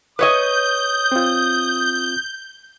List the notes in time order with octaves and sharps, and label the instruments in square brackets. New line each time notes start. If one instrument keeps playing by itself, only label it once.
[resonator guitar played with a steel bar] B4 C#5 D#5 [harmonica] D#6 [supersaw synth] G6
[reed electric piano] C4 F4